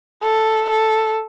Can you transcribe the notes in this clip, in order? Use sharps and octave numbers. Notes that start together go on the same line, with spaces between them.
A4
A4